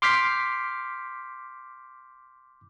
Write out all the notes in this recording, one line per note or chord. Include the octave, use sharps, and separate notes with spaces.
C6 D6 F6 G6 B6 C7